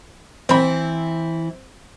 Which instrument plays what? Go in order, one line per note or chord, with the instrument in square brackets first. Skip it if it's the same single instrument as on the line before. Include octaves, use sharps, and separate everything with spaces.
[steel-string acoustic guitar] E3 E4 [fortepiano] C4 B5